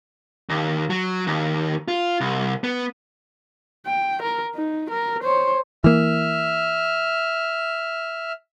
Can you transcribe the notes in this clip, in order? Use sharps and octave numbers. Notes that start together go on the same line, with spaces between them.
D#2
F#3
D#2
F4
C2
B3
G5
A#4
D#4
A#4
C5 C#5
E3 A#3 E5 F6